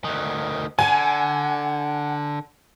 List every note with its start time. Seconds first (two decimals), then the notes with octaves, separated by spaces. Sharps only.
0.05 D2 D#3
0.79 D3 F#5 G#5